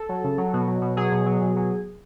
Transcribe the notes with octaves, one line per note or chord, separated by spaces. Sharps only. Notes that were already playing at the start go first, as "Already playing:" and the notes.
Already playing: A4
F#3
C#3
F#3
B2
F#3
B2
F#3 G#4
B2
F#3
B2
F#3